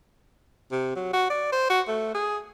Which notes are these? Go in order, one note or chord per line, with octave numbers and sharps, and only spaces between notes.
C3
F#3
F#4
D5
C5
F#4
A3
G#4